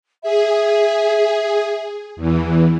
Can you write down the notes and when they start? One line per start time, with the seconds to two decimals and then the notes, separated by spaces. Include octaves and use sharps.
0.23 G#4 E5
2.16 E2 E3